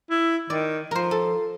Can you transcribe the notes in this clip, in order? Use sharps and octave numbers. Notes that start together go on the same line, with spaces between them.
E4
D#3 D5
F3 A#4 C5
A4